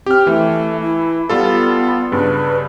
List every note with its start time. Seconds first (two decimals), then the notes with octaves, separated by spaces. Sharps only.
0.06 C4 G4 F6
0.27 E3 A3
0.80 E4
1.29 G3 B3 F4 A4
2.12 G2 C#3 B4